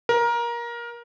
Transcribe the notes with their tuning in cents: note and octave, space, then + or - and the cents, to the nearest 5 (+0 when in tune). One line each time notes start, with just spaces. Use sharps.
A#4 +20